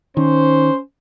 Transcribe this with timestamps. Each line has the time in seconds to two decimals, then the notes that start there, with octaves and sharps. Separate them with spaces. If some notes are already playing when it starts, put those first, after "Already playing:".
0.17 D#3 C#4 C5